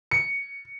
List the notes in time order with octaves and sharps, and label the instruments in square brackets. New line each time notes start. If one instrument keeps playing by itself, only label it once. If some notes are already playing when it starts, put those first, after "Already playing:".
[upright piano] C#7